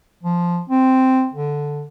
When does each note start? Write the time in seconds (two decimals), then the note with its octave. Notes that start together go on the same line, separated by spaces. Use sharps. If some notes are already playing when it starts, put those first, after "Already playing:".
0.23 F3
0.69 C4
1.34 D3